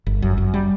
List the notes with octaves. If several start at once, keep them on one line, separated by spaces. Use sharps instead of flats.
G1
F#2
F#2
G3